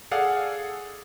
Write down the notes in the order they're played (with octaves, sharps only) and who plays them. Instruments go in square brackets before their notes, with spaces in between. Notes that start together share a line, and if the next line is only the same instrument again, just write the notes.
[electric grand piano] G#4 A4 D5 F5 F#5